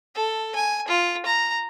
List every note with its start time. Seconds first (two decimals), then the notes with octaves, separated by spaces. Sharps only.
0.15 A4
0.56 G#5
0.89 F4
1.26 A#5